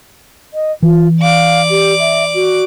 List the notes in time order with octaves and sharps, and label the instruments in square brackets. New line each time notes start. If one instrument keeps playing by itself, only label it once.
[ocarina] D#5
[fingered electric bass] E3 [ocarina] F4
[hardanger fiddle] D5 D6 [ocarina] F5
[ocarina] G4
E5
F#4